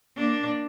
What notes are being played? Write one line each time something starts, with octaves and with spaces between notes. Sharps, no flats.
A#3 D4